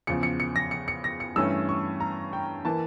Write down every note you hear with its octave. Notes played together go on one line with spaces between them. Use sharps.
E2 C#3 F3 C#7
C#7
C#7
A#6
C#7
C#7
A#6
C#7
G2 E3 A3 C#4 E6
C#6
A#5
G5
E3 A#3 A5